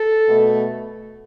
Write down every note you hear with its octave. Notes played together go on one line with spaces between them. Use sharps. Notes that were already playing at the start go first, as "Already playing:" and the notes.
Already playing: A4
B2 A3